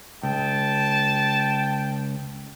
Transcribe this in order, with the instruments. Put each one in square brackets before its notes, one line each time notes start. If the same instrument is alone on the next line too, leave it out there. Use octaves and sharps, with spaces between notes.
[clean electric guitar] C#2 [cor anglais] G5 [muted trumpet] A5